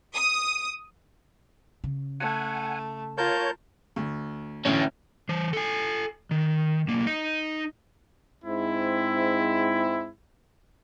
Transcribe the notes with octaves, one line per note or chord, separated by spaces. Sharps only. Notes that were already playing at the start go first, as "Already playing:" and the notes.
D#6
C#3
A3 F#5 G#5
F4 A#4 C#5 A5 G6
D2
D2 A2 C#4
E3 C5
A4 G#5
D#3
B1 A#3
D#4 D#5
G#2 C4 E4